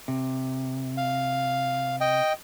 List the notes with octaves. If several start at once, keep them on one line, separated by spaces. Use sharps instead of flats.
C3
F5
D#5 G5